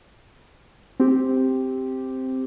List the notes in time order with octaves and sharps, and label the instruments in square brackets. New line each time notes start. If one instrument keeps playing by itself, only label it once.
[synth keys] C4 G4